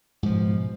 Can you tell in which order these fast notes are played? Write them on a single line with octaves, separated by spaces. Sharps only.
G#2 F3 B2